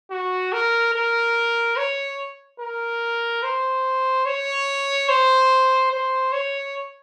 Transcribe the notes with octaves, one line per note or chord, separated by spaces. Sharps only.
F#4
A#4
A#4
C#5
A#4
C5
C#5
C5
C5
C#5